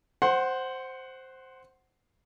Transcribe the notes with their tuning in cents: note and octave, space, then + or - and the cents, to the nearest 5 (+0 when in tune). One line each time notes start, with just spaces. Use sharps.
C5 +0 F#5 +10 C6 +35